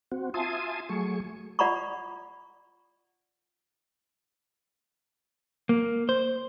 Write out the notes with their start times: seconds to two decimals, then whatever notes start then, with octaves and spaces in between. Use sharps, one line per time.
0.12 C4 F#4
0.34 F4 E5 G#5 A5 C6 D#6
0.89 F#3 A3 G#4 C#6
1.59 F4 D5 F#5 A#5 B5 C#6
5.69 A#3
6.09 C5